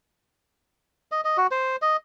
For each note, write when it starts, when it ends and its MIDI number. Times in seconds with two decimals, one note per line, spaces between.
1.12 1.21 75
1.25 1.37 75
1.37 1.47 66
1.51 1.76 72
1.82 1.97 75